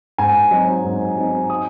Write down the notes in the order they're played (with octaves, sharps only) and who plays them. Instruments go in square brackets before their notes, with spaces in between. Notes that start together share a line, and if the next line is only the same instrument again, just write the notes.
[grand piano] G#2 G#5
F#3 C4 D#4
G#2
F#3 C4 D#4
D#6